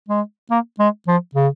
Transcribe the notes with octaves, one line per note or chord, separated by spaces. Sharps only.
G#3
A#3
G#3
F3
C#3